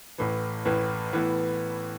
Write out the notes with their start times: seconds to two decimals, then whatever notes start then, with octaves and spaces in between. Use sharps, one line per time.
0.18 A1 A2 E3
0.65 A1 A2 E3
1.13 A2 E3 B3